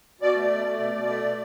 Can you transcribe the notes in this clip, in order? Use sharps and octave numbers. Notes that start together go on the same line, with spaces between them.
B2 D5
A3
B2
A3
B2
B2
A3
B2